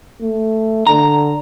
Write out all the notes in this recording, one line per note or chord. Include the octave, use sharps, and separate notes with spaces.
A3
D3 A#5